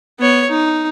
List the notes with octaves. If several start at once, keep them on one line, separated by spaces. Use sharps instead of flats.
B3 C#5
D#4